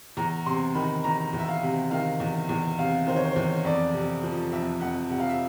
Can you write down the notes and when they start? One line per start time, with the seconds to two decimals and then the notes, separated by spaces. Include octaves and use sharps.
0.17 E2 A#5
0.46 C3 C6
0.75 D#3 B5
1.04 E2 A#5
1.33 E2
1.39 E5
1.49 F5
1.63 C3
1.91 D#3 F5
2.20 E2
2.49 E2
2.79 C3 F5
3.07 D#3 C5
3.17 C#5
3.25 C5
3.36 E2 C#5
3.65 F2 D5
3.94 C3
4.23 F3
4.52 F2 E5
4.81 F2 F#5
5.10 C3 F#5
5.20 F5
5.29 E5